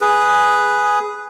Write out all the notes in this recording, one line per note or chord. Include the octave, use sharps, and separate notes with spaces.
G#4 B4